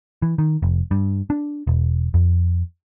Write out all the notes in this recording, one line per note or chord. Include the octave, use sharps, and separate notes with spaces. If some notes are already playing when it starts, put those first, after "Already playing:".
E3
D#3
F1
G2
D4
E1
F2